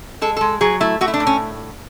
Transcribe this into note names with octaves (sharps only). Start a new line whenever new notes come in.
G#3 A4
G#3 A4
F#3 G#4
A3 E4
A3 F#4
E4
D4
A2
C#4